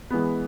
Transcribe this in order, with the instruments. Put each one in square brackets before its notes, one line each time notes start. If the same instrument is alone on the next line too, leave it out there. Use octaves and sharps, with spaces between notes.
[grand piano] E3 G#3 B3